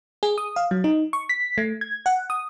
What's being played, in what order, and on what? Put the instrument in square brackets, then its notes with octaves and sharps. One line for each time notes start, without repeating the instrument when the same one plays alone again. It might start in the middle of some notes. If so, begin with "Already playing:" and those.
[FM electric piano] G#4
D#6
F5
F#3
D#4
C#6
B6
A3
G#6
F#5
D#6